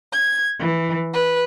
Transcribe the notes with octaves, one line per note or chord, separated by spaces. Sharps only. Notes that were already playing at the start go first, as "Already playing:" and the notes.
G#6
E3
B4